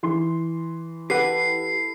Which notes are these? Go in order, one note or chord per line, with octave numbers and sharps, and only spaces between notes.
E3 C6
E4 G4 A4 B4 F#5 C7